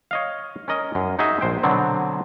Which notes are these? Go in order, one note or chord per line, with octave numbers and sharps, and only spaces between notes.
C#5 D#5 F5
C#4 A#4 D#5
F#2
D#4 F#4 G#4 D#5 E5
A#1 C5 G5
B2 D3 F#3 B3 C4